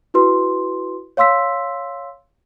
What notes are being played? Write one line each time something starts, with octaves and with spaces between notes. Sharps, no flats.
E4 F#4 B4 C6
C#5 F5 C6 E6 B6